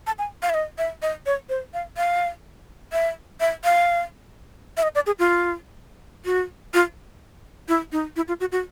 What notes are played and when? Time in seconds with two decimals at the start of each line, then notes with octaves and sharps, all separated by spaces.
0.07 A5
0.19 G#5
0.42 F5
0.50 E5
0.54 D#5
0.78 E5
1.02 D#5
1.26 C#5
1.49 C5
1.74 F5
1.97 F5
2.93 E5
3.40 E5
3.64 F5
4.77 E5
4.83 D#5
4.95 D5
5.06 G#4
5.19 F4
6.25 F#4
6.74 F4
7.68 E4
7.92 D#4
8.16 E4
8.28 F4
8.40 F#4
8.52 F#4